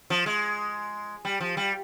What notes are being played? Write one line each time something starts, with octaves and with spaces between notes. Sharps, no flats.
F3
G#3
G3
F3
G3